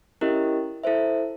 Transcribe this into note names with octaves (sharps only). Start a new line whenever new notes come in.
C#4 E4 G4 A#4 D#5
E4 A4 C5 E5